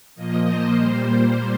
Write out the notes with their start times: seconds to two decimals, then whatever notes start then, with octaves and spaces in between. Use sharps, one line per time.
0.15 A#2 F3 A#3 D#5
0.46 C5
0.77 A#2 G3 A#3